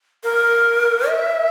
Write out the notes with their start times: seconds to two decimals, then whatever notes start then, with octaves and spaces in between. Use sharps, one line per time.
0.24 A#4
1.09 E5